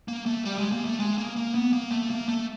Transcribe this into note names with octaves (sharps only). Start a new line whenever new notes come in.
A#3
A3
G3
G#3
A#3
A3
G#3
A#3
A#3
B3
A#3
A3
A#3
A3